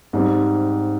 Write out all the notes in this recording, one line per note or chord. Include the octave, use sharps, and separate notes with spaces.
G#2 G3 C4